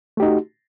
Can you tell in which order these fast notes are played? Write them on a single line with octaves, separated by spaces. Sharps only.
A3 G4 D#4 F#4